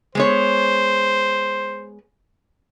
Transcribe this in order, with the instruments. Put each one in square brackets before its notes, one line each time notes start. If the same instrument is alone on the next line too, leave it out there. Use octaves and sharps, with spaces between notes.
[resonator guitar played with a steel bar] G#3 B3 C#5 [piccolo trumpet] C5